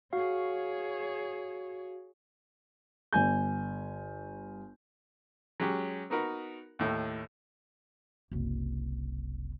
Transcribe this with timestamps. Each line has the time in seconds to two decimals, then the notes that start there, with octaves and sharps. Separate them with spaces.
0.13 F#4 G#4 C#5 F5
3.12 G1 G#5 G6
5.60 F#3 G#3 C#4 G4
6.10 B3 D#4 F#4 A#4 B4
6.79 D#2 A2
8.32 F#1 C2